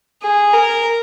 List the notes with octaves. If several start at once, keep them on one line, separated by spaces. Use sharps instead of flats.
G#4
A#4